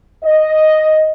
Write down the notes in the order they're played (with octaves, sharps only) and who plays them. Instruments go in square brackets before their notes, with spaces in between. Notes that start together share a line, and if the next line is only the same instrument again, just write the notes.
[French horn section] D#5